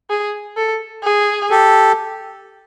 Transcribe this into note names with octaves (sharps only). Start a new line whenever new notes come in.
G#4
A4
G#4
G4 A4